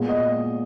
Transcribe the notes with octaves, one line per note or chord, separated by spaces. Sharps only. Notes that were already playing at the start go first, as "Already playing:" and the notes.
Already playing: A#2 G#3 B3
D#5